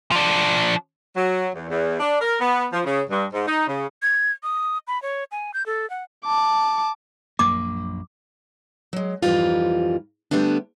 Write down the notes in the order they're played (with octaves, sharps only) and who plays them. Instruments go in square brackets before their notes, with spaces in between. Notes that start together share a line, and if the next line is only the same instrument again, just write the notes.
[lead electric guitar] F3 D4
[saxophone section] F#3
E2
E2
D4
A#4
B3
F3
C#3
G2
G#2
D#4
C#3
[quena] G#6
D#6
B5
C#5
G#5
G6
A4
F#5
[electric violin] A5 D6
[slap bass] A#1 F#2 A#3 [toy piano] D6
[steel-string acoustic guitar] F#3 G#3
F2 G#2 E3 G3 F4 A#5
D3 G3 A3 B3 D4